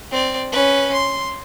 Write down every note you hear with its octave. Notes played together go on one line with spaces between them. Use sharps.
C4 D5
C#4 B4
C6